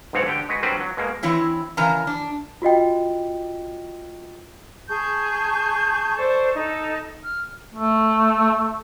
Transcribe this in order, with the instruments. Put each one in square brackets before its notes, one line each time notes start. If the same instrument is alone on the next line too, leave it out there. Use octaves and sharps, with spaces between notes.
[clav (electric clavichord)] B1 G#2 B2 C4 C#5 F#5
D3 G4 G5
G#3 F#4 B4
F#3 G3 C4 D4 B4 C5
F#3
B2 G#3 A#3
[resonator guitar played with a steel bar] E3 C4 E4 C#5
C#3 E3 A#4 G#5 A#5
D4
[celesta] F4 F#4 D#5 G5
[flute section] G#4 A5 C#6 G6
A4 C5 D5 C#6
D#4 A4
F6
[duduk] A3